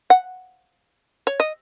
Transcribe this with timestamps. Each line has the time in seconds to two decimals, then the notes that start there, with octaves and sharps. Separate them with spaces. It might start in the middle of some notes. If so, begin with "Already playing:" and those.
0.10 F#5
1.27 C#5
1.40 D#5